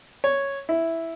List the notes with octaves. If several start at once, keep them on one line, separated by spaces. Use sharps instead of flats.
C#5
E4